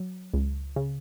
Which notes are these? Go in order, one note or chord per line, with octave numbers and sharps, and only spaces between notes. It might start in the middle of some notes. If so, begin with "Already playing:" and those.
Already playing: F#3
C#2
C#3